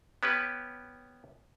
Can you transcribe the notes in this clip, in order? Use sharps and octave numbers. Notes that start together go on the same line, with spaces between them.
B3 C#4 G4 B4